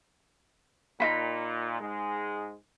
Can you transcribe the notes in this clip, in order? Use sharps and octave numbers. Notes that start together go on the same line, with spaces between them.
A#2 D#4 F4 B5
G#2 G#3